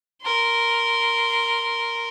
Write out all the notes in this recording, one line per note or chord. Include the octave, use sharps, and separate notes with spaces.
A#4 C6